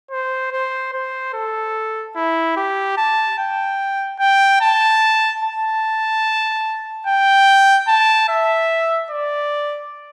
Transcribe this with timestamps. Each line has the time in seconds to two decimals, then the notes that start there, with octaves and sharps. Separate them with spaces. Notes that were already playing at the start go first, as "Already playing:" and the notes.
0.11 C5
0.52 C5
0.93 C5
1.34 A4
2.16 E4
2.57 G4
2.98 A5
3.38 G5
4.20 G5
4.61 A5
5.43 A5
7.07 G5
7.88 A5
8.29 E5
9.11 D5